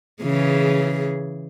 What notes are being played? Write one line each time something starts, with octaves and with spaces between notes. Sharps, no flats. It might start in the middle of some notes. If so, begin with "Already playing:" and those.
C#3 E3 G#4